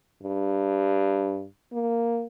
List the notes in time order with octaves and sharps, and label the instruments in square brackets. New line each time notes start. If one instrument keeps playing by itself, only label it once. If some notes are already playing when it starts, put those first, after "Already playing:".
[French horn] G2
A#3